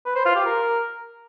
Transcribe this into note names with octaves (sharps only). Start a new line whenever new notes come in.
B4
C5
F4
G4
A#4